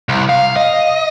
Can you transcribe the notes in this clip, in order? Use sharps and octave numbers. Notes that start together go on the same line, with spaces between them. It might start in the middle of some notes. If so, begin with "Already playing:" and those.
C2
F5
D#5